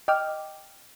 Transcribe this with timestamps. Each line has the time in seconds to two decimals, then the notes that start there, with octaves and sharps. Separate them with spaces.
0.08 D#5 G5 D6 F6